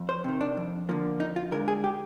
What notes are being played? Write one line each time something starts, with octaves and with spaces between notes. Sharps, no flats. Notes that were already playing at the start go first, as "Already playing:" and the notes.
Already playing: F2
C5
C3 D#3
D4
F2
D3 F3 A#3
F2 D#4
F4
D3 G#3 A#4
G#4
G4